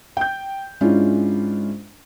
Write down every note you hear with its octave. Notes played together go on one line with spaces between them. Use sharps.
G5 G6
G#2 G#3 C#4 D4 E4 F4